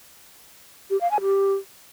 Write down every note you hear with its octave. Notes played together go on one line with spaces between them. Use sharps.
G4
F5
G#5
G4